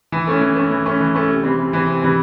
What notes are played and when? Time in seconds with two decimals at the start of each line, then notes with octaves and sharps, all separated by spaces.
0.12 E3
0.27 A3 C#4
0.41 E3
0.56 A3 C#4
0.71 E3
0.86 A3 C#4
1.00 E3
1.15 A3 C#4
1.29 C3
1.43 E3 G3 C4
1.59 C3
1.73 E3 G3 C4
1.88 C3
2.02 E3 G3 C4